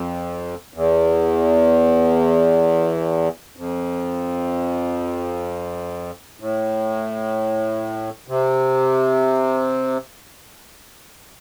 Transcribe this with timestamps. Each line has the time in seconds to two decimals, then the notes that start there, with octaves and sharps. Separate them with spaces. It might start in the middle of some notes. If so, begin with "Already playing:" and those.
Already playing: F2
0.74 E2
3.57 F2
6.40 A2
8.28 C3